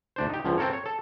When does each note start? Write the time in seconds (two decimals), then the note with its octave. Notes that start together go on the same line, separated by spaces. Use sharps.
0.16 D2 D4 C5
0.29 D#4 G4
0.44 C#2 D3 F3
0.58 C4 A4 A#4 C#5
0.73 C#5
0.86 A4